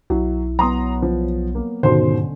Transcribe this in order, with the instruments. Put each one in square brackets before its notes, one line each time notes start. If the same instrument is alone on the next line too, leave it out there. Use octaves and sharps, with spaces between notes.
[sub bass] B1 [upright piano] F#3 [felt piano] E4
[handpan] F#3 B3 [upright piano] A#5 C6 D#6
[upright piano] F3
A#3
[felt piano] D#2 B2 [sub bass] G#2 [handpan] D3 C#4 [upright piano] C5 C6